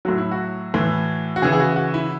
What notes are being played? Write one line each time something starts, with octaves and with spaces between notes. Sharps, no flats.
A2 F#3 F#4
E4
F#4
A2 E3
F#4
C#3 E3 G#4
G#4
F#4
F#4
E4